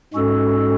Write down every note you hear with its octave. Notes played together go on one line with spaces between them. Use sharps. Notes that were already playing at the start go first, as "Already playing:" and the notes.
G#2 G#3 C#4 F#4 A4